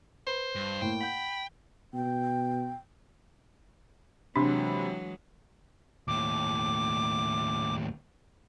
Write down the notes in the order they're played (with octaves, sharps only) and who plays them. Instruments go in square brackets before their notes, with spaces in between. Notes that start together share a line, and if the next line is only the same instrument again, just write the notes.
[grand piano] B4 [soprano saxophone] C5
[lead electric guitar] G2
[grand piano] A2 A#3 E4 [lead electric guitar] G5
[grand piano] F#5 G6 [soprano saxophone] B5
[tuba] B2 [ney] G5
[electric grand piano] C3 B5 [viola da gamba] E3 F#3 G#3 [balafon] D4
[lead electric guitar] D#2 A2 [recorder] D6